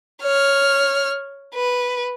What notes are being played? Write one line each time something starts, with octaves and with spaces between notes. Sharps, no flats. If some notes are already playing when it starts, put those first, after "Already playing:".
C#5 F6
B4